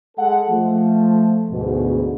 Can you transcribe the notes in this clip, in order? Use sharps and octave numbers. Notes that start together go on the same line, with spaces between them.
G#3 A4 F#5
F3 A3
D2 G#2 B2